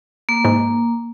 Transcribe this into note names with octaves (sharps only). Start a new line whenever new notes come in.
A#3
G#2